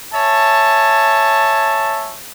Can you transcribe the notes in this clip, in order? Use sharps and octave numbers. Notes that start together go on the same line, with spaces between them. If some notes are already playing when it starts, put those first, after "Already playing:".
C#5 E5 G#5 A5